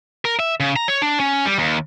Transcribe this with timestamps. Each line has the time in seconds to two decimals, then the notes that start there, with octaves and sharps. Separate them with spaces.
0.25 A#4
0.39 E5
0.60 C#3
0.76 A#5
0.88 C#5
1.02 D4
1.20 C#4
1.46 G3
1.58 D#2